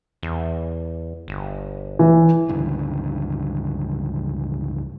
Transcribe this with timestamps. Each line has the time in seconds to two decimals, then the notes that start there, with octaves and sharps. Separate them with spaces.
0.23 E2
1.28 G1
1.99 E3
2.49 C#2 G2 D3